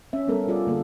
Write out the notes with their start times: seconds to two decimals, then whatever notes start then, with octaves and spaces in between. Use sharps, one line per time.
0.13 C#4 E5
0.28 G3 B3 C#4 A4 A#4
0.48 G3 F4 G#4 D5
0.67 D3 A#3 A4